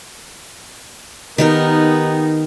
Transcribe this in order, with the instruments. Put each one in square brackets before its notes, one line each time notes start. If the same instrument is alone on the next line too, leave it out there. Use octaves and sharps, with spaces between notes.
[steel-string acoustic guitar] D#3 G4 A#4 [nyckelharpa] B3 D#4